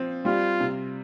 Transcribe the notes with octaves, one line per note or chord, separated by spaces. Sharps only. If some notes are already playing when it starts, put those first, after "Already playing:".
Already playing: F3 C4
G3 F4
C3